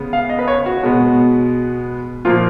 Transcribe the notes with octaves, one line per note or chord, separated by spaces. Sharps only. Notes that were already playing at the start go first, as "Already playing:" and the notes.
Already playing: C#3 G#3 B3
F5
D#5
B4
C#5
F#4
B2 G#3 B3
A#2 F3 A#3 F4